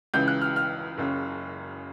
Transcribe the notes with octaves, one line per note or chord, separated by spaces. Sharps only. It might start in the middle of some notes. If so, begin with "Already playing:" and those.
C#2 C#3 E3 G6
F#6
F6
F6
F#1 F#2 C#3